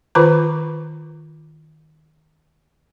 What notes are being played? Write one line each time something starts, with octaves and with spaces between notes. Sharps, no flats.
D#3 F4 B4 C5 B5 D6